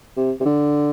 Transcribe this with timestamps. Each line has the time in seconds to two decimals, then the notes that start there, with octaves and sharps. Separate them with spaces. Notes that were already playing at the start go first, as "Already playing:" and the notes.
0.17 C3
0.40 C3
0.45 D3